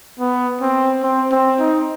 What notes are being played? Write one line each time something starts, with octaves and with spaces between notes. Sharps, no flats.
B3
C4
C4
C4
D#4